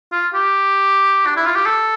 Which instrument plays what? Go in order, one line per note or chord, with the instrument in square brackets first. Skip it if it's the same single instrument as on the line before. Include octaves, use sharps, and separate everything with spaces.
[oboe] F4
G4
D4
E4
F4
G4
A4